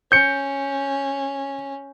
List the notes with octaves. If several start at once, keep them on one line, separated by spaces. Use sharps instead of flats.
C#4 G6 C#7